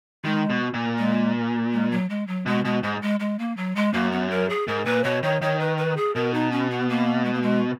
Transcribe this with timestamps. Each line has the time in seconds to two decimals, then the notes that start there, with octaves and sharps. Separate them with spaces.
0.24 D#3 G#3
0.50 B2
0.74 A#2
0.98 G#3
1.73 G#3
1.91 F#3
2.10 G#3
2.28 F#3
2.46 B2 G#3
2.65 B2 G#3
2.83 G#2 G#3
3.02 G#3
3.20 G#3
3.39 A#3
3.57 F#3
3.76 G#3
3.93 F#2 A#3
4.12 B3
4.30 A#4
4.50 G#4
4.68 G#2 A#4
4.85 A#2 B4
5.04 B2 C#5
5.23 D#3 C#5
5.42 D#3 C#5
5.60 B4
5.78 B4
5.97 G#4
6.15 B2 A#4
6.34 D#4
6.52 C#4
6.70 B3
6.89 A#3
7.25 G#3
7.34 A#3
7.42 G#3